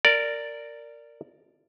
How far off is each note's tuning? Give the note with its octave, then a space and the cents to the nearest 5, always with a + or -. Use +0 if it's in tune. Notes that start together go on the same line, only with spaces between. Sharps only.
A#4 -15 D5 +0